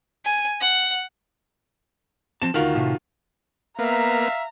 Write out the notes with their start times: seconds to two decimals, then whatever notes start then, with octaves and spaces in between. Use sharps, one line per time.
0.25 G#5
0.61 F#5
2.42 F3 C4 A5 E7
2.54 D2 D#3 F4 F#4 A#4 B4
2.75 A2 C3
3.79 A#3 B3 E5 F5 A#5